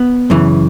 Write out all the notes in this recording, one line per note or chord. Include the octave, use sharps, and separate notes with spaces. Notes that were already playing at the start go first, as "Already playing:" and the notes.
Already playing: B3
F#2 C#3 E3